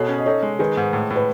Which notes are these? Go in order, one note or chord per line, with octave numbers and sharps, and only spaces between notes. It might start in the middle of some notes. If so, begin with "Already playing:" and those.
Already playing: B2 G#4 A4 C#5
C#4
D#5
D#4 A4 C#5
G#3
D#3 G#4 B4
G#2
A2
A2
B4